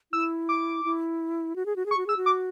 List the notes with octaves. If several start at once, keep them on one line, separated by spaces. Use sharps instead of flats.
E4 E6
D6
E4
F#4
G#4
F#4
G#4
C#6
F#4
G#4 E6
F#4
D6